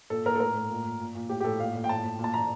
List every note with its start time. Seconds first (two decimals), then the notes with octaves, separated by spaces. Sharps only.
0.10 A#2 A4
0.25 A#2 A#4
0.35 A4
0.40 A2 A#4
0.55 A2
0.71 A#2
0.85 A#2
1.00 A#2
1.15 A#2
1.29 A2 G4
1.40 G4
1.44 A2 A4
1.59 A#2 F5
1.74 A#2
1.84 G5
1.89 A2 A5
2.04 A2
2.19 A#2
2.24 A5
2.34 A#2 A#5